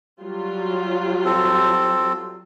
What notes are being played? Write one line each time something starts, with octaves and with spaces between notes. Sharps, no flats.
F#3 G3 F4
C4 A4